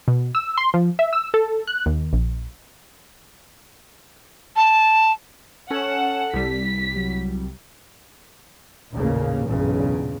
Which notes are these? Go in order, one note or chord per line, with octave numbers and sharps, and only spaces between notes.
B2
E6
C6
F3
E5
E6
A4
F#6
D#2
A#1
A5
C#4 A4 F#5 E7
C2 G3 B6
F#3
A1 D#2 A#2 C#3 A#3
B1 E2 G2 A#2 C#3